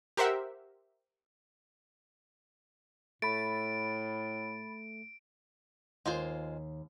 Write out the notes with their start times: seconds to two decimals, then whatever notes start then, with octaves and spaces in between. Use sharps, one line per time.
0.17 G4 A#4 C5 E5 F#5
3.22 A2 A3 B5 A6 D7
6.06 D#2 G#3 F4 C5